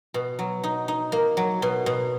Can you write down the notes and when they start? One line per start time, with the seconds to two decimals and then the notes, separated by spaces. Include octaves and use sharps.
0.14 B2
0.39 F#3
0.64 D#4
0.88 D#4
1.12 A#3
1.37 F#3
1.62 B2
1.86 B2